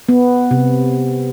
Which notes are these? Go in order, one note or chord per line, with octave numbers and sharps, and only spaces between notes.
B3
C3